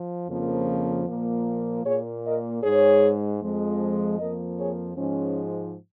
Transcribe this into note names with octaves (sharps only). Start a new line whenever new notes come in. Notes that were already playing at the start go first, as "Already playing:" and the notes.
Already playing: F3
F2 C#3 F3 A#3
A#2 F3 A#3
A#2 A#3 G#4 C#5
A#4 D#5
G#2 G#3 G#4 C#5
F2 F3 G#3
F2 F3 A#3 A#4 D#5
G#4 C#5
G#2 F3 G#3 C#4